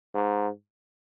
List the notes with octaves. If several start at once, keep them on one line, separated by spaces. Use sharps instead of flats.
G#2